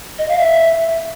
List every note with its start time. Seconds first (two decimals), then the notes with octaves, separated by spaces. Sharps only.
0.18 D#5
0.29 F5
0.39 E5